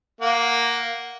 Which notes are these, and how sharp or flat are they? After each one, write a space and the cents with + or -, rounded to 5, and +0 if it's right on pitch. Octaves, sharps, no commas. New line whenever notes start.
A#3 +0 F#5 -10